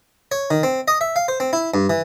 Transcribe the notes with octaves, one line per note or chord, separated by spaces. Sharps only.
C#5
D#3
C4
D#5
E5
F5
C5
C4
E4
G2
E3